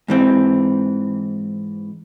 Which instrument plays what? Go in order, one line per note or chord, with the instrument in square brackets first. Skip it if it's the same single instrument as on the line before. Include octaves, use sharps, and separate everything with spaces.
[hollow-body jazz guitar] G#2 E3 C4